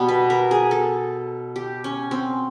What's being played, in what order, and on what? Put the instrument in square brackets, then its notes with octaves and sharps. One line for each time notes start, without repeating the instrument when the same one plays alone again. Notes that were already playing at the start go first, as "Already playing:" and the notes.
Already playing: [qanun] B2 G3 B3
B4
A#4
G#4
A4
G4
C#4
C4